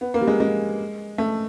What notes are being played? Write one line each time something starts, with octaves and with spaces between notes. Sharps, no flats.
B3
A#3
G3
G#3
G#3
A3